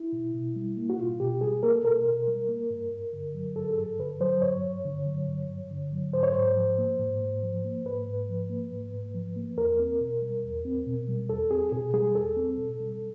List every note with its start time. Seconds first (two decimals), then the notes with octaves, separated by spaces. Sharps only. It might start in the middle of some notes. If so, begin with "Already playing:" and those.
Already playing: E4
0.12 B2
0.34 B2
0.56 G3
0.77 A#3
0.90 F#4
0.99 B2 F4
1.20 B2 G4
1.41 G3 G#4
1.63 A#3 A#4
1.75 A4
1.84 B2 A#4
2.06 B2
2.27 G3
2.49 A#3
2.70 G2
2.92 G2
3.13 D3
3.34 F#3
3.56 G2 A4
3.71 G#4
3.78 G2 A4
3.99 D3 B4
4.20 F#3 C5
4.42 G2 C#5
4.63 G2
4.85 D3
5.06 F#3
5.28 G2
5.49 G2
5.71 D3
5.93 F#3
6.13 G#2 C5
6.23 C#5
6.33 G#2 C5
6.57 F3
6.78 A#3
6.99 G#2
7.21 G#2
7.43 F3
7.64 A#3
7.85 G#2 B4
8.07 G#2
8.29 F3
8.50 A#3
8.71 G#2
8.94 G#2
9.14 F3
9.36 A#3
9.57 E2 A#4
9.79 C4
10.01 B2
10.22 G3
10.44 E2
10.65 C4
10.86 B2
11.08 G3
11.29 E2 A4
11.51 C4 G#4
11.72 B2 G#4
11.94 G3 G#4
12.15 E2 A4
12.36 C4
12.58 B2
12.80 G3